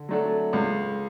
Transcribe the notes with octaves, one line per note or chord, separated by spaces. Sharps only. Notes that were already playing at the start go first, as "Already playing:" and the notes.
Already playing: D3
F#3 A3 D4 A4
C#2